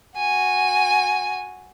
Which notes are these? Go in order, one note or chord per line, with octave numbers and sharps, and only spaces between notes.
F#4 G#5